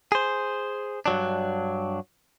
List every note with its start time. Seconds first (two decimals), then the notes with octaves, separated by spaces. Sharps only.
0.12 G#4 C5
1.06 G2 F#3 D4